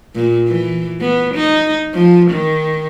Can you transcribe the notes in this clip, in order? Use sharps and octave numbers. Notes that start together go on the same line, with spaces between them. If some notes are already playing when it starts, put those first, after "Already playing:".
A#2
E3
B3
D#4
F3
D#3